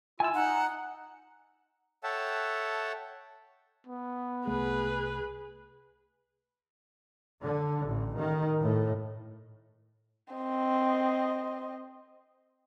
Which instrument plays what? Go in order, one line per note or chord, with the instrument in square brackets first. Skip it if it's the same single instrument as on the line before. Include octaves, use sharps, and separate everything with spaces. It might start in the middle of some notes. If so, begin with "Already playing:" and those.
[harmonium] E4 F4 [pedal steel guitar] G#5 E6
[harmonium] D#4 [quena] F#5
[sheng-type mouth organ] A4 C#5 E5 F#5 G5 A5
[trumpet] B3
[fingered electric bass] C2 A3 [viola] G#4 B4
[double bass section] D3
A1
D#3
A2
[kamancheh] C4 D#5